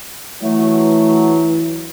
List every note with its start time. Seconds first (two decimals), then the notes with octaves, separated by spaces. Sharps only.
0.42 E3 F#3 A3